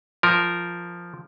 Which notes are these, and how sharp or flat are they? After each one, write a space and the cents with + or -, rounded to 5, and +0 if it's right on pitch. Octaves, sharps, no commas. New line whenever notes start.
F3 -5 A#4 +0